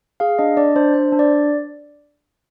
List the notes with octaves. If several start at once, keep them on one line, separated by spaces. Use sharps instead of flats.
G#4 F5
D4 D#5
D4 D5
D4 C5
D4 C5
D4
D5